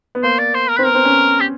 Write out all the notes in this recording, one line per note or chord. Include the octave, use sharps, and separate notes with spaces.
B3
A#3 C5
D5
C5
A#4
C4 B4
B3 A#4
C4
C#4
G4